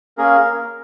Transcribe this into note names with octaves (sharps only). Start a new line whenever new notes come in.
A#3 C#4 G#4 A#4